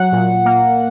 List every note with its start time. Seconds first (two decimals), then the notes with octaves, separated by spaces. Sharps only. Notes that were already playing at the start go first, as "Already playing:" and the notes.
Already playing: F#3 F#5
0.12 A#2
0.45 A#3